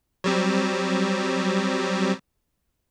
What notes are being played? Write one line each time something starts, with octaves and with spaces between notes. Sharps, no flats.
F#3 G3 C4